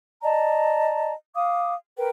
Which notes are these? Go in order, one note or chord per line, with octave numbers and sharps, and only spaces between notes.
D5 D#5 A5 A#5
F5 D6 D#6
A#4 B4 G5